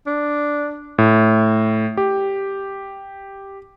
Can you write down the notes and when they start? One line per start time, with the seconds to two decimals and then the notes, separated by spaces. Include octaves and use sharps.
0.06 D4
0.98 A2
1.97 G4